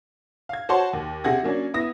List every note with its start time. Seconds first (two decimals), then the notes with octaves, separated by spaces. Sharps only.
0.49 F5 G#6
0.69 F#4 C5 C#5 F#5 A5 C6
0.93 D#2
1.24 C3 G#4 F#5 G#6 A#6
1.43 F#3 A#3 C#4 D4
1.74 B3 E4 D#6 A#6